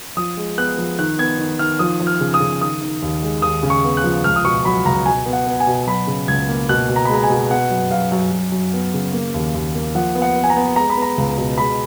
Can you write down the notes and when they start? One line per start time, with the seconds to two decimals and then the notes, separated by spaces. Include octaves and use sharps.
0.17 F3 D#6
0.37 G#3
0.58 B3 F#6
0.78 F3
0.99 D#3 F#6
1.18 B3 G#6
1.39 D#3
1.59 D#3 F6
1.79 F3 D#6
2.00 F3
2.07 F6
2.20 C#3
2.34 D#6
2.40 C#3
2.61 D#3 D#6
2.82 D#3
3.02 D#2
3.23 G#3
3.42 D#2 D#6
3.63 C#3
3.70 C#6
3.84 B3
3.97 F#6
4.04 F3
4.24 C#2 F6
4.36 D#6
4.45 B2 C#6
4.65 F#3 B5
4.85 C#2 A#5
5.06 B2 G#5
5.26 B3
5.33 F#5
5.47 B3
5.60 G#5
5.67 B2
5.87 F#3 B5
6.07 C#3
6.28 C#2 G#6
6.49 A#3
6.69 B2 F#6
6.89 B2
6.96 A#5
7.05 B5
7.09 G#3 A#5
7.23 G#5
7.30 B2
7.50 B3 F#5
7.71 F#2
7.91 F#2 F5
8.12 F#2
8.32 F#2
8.52 F#2
8.73 B3
8.94 C#3
9.13 A#3
9.34 D#2
9.54 D#2
9.75 A#3
9.95 F3 F#5
10.15 B3
10.22 F#5
10.36 B3
10.44 G#5
10.50 A#5
10.57 B3
10.76 G#3 A#5
10.90 B5
10.97 B3
11.02 A#5
11.18 C#2
11.38 B2
11.58 G#3 B5